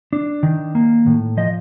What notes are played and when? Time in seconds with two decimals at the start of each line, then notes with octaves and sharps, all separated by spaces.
0.13 D4
0.43 D#3
0.75 A#3
1.06 A2
1.37 F3 D#5